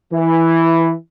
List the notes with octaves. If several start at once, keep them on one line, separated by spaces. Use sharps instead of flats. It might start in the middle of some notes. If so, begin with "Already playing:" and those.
E3